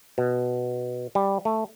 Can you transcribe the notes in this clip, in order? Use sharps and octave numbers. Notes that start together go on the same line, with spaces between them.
B2
G3
A3